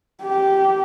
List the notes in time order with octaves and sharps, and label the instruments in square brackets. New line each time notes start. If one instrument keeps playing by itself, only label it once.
[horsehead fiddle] G4